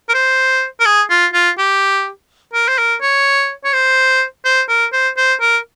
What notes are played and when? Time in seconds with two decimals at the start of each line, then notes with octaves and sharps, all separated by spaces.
0.09 A#4
0.14 C5
0.80 A#4
0.85 G#4
1.10 F4
1.33 F4
1.58 G4
2.53 A#4
2.68 C5
2.78 A#4
3.01 C#5
3.64 C#5
3.73 C5
4.45 C5
4.69 A#4
4.92 C5
5.17 C5
5.41 A#4